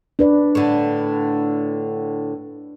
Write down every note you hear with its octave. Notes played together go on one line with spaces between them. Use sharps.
D4 B4 D5
A2 D3